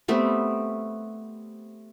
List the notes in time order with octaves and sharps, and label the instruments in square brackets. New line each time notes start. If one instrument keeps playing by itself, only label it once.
[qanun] G3 A3 B3 C4